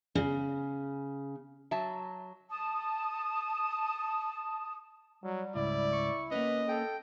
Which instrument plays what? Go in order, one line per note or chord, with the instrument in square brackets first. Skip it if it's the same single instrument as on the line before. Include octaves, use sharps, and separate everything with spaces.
[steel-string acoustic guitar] C#3
[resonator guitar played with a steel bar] F#3 E5 A5
[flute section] A5 D#6
[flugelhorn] F#3 [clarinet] G3
[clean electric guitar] C#2 G#2 [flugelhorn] E4 [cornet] D5
[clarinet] C#6
[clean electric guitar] A#3 B3 C#4 [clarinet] B4 [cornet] D#5
[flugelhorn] A4 [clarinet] G5